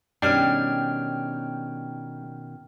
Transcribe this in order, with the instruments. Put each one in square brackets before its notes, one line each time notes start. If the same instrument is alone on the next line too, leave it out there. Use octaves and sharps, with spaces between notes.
[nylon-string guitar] B2 D#3 C#4 [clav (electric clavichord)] G3 D4 [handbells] G5 F6 G#6